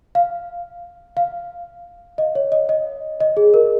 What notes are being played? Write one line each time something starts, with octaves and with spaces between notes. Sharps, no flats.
F5
F5
D#5
C#5
D#5
D#5
D#5
G#4
A#4